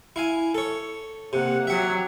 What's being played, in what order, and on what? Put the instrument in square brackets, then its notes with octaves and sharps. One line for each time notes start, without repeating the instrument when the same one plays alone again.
[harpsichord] E4 F5 G#5
A4 C#5
[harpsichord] C3 [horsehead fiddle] A#3 F#5
[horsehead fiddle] F#3 G4 [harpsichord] E5 F#5